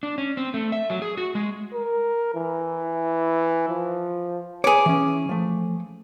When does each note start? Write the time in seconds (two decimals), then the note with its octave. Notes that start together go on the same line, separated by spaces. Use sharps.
0.03 D4
0.18 C#4
0.37 C4
0.54 A3
0.72 E5
0.90 F#3
1.02 G#4
1.17 F#4
1.35 G#3
1.74 A#4
2.35 E3
3.69 F3
4.64 G#4 B4 C#5 D6
4.86 E3 C#4
5.29 F3 A3